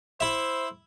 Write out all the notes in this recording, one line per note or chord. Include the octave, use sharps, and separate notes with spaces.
E4 C5 E5